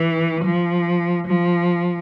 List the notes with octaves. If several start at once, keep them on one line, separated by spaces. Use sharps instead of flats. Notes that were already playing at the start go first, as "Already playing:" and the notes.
Already playing: E3
F3
F3